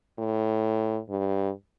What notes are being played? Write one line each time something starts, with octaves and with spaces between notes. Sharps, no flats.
A2
G2